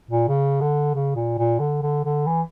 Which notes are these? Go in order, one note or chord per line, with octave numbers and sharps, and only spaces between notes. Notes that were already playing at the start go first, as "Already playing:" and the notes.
A#2
C#3
D3
C#3
A#2
A#2
D3
D3
D3
E3